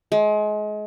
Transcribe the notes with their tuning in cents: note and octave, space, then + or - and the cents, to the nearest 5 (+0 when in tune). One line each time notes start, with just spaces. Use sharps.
G#3 +30